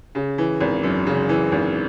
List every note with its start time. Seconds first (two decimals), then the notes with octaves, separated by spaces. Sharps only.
0.15 C#3
0.38 E3
0.60 G#1
0.83 F#2
1.06 C#3
1.29 E3
1.52 G#1